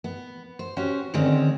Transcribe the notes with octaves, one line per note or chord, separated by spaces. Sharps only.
B3
C5
C#4 F#4 G4 C5
D3 D#3 G#3 C4 C#4